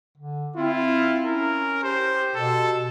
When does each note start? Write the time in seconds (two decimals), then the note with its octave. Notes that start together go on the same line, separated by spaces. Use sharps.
0.18 D3
0.56 C4 E4 F4
1.26 C#4 A#4
1.83 G4 C5
2.35 B2 A4